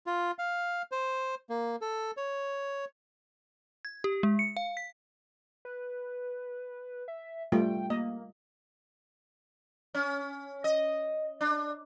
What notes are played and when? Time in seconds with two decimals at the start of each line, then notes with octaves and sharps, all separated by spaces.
0.06 F4
0.39 F5
0.92 C5
1.50 A#3
1.81 A4
2.17 C#5
3.85 G#6
4.04 G4
4.23 G#3
4.39 C#7
4.57 F5
4.77 B6
5.65 B4
7.08 E5
7.52 G3 A3 F4 G5
7.90 A#3 D#5
9.94 C#4
10.64 D#5
11.41 D4